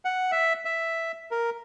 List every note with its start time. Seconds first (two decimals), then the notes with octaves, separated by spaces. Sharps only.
0.05 F#5
0.32 E5
0.65 E5
1.31 A#4